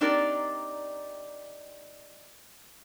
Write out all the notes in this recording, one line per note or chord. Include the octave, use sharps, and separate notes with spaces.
C4 D4 D#4 G4 A#4 D5